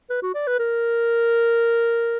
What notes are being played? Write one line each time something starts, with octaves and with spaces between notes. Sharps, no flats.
B4
F#4
D5
B4
A#4